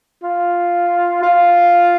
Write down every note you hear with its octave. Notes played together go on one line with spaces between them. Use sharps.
F4
F4